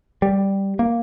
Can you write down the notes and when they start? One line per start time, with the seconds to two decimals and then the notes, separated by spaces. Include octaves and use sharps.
0.22 G3
0.79 A#3